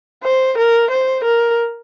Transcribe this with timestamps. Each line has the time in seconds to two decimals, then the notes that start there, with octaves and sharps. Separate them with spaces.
0.24 C5
0.58 A#4
0.91 C5
1.25 A#4